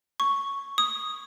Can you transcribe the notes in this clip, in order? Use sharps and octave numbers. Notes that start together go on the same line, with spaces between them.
C#6
D#6